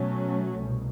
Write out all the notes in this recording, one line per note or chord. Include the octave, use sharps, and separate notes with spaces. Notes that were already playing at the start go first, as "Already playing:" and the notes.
Already playing: B2 F#3 A3 C#4
C2 B2